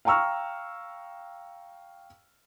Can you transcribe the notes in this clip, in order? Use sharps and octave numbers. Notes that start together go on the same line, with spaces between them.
F5 G5 A#5 C#6 E6 F6